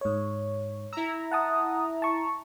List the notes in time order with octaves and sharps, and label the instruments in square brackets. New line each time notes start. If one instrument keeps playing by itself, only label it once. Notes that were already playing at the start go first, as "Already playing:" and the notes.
[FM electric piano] G#2 C#5
[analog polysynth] E4 A#5 [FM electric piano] E6
[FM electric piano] F#5 A5 D#6
A5 C#6